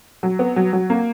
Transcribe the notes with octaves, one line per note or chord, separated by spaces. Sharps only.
F#3
B3
F#3
F#3
A#3